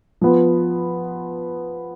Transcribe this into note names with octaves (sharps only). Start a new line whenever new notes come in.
F3 B3 F4